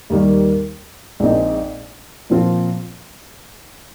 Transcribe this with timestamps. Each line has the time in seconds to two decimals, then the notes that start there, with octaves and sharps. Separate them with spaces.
0.10 D#2 D#3 G3 A#3
1.20 A#1 A#2 G#3 C4 D#4
2.30 A#2 F3 C4 F4